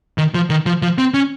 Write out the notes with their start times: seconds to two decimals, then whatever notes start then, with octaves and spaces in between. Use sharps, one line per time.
0.18 D#3
0.34 F3
0.50 D#3
0.66 F3
0.82 F3
0.98 C4
1.14 C#4